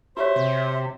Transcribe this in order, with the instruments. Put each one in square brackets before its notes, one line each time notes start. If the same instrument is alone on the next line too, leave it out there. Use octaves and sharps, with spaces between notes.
[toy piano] F#4 G4 C#5 [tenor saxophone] C5 [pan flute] E5
[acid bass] C3